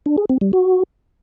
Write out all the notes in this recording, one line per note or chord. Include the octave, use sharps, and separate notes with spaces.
D4
G#4
C4
G3
F#4